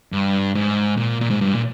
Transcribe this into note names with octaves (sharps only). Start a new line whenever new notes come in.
G2
G#2
A#2
A#2
G#2
G2
A#2